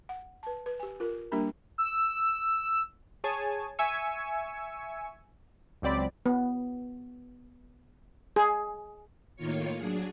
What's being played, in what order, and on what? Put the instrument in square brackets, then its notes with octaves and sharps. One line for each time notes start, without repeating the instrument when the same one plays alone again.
[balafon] F#5
B4 A5
B4
G4 G#5
F4 A#4
G3 A#3 D4 G4 A#4 A#5
[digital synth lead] E6
[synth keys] G#4 C#5 G#5 A5
E5 G#5 C#6 E6 C#7
C#2 F#3 C4 D5 B5
[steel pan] B3
G#4
[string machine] A2 D#3 A#3 F4 C#5 C#7
F#3 D4 G#4